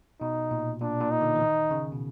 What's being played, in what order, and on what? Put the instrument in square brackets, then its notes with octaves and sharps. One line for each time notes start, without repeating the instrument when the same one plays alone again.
[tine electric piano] B2 [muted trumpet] D#4
[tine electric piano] A#2
[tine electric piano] A#2 [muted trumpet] D4
[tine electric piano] A#2
[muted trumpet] D#4
[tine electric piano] D3
E3
D#3
C#3
B2